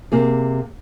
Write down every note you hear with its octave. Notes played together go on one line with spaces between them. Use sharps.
C3 A#3 G#4